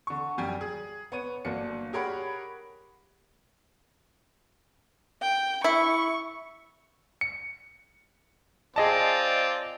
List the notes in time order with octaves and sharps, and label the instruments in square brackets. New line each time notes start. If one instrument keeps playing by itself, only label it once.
[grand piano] D3 C#6
F#2 G3 G5 G#5
G#4
B3 C#5 D#7
G1 F#3 A#3 D4 C#7
G4 G#4 A#4 C#5 F#5 B5
[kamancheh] G5
[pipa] E4 [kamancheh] C#6
[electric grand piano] C#7
[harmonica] C4 F4 D5 [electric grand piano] G#4 D#5 A5